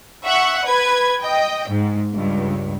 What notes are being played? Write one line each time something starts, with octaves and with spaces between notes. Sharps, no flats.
E5 F#5 C#6
B4 G#6
D#5 G5
G#2
C#2 G2